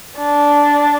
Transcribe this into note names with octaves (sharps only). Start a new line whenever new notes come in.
D4